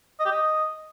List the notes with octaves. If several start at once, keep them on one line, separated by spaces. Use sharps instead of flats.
D#5
G4
D#5